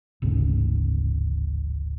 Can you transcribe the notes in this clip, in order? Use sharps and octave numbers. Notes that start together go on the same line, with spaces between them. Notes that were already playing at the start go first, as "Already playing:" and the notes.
D1 A1 G#2 C#3